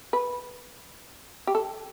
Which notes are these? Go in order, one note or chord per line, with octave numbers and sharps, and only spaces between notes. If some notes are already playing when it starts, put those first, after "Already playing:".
B4
G4
A4